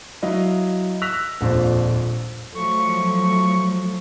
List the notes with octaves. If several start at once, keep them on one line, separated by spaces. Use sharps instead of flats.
F#3 E4 D#5 F5
E6 F#6 A#6 B6 F7
D#1 A#1 F2 F3 D4 C5
F3 F#3 A3 A4 C#6